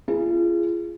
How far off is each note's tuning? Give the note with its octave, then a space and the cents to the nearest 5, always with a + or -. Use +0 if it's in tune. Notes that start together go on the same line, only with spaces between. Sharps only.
F4 -35 G#4 +0